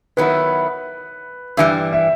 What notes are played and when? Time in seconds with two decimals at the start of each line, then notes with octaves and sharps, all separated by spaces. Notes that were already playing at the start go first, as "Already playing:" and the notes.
0.17 D#3 F#3 B3 E4 B4
1.57 G2 E3 G3 E5
1.93 E5